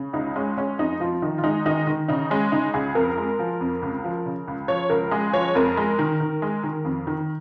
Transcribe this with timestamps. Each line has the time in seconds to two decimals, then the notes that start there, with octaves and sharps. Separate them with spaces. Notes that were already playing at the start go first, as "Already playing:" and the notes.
Already playing: C#3
0.13 C#2 D#4
0.36 G#3 C#4
0.57 G#3 C#4
0.79 F2 D#4
1.00 F3 F4
1.22 D#3 D#4
1.38 F4
1.43 G#3 D#4
1.65 D#3 D#4
1.87 D#3
2.08 C#3 D#4
2.31 G#3 C#4
2.52 C#3 D#4
2.74 C#2 G#4
2.95 F2 A#4
3.18 G#3
3.39 F3
3.61 F2
3.82 C#2
4.04 F3
4.26 C#3
4.48 C#2
4.68 F3 C#5
4.90 C#2 A#4
5.11 G#3 G#4
5.33 F3 C#5
5.55 F2 A#4
5.77 G#3
5.99 D#3
6.20 D#3
6.42 G#3
6.63 D#3
6.85 F2
7.07 D#3